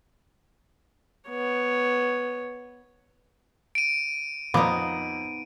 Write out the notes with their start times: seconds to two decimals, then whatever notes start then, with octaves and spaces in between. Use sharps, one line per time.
1.30 B3 C#5
3.75 D7 D#7
4.54 F2 A#2 B3 D#4 D6